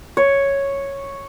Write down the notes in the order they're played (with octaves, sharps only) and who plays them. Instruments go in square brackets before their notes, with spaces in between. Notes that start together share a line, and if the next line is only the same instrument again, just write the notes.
[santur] C#5